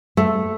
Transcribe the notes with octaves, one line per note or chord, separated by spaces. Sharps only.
A3